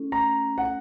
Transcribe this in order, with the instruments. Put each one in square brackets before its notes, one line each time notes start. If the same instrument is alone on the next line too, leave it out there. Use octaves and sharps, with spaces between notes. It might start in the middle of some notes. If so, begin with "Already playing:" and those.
Already playing: [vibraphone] A3 C#4 E4 A4
[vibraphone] A3 [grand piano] A#5
[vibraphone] C#4 E4 A4 [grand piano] F#5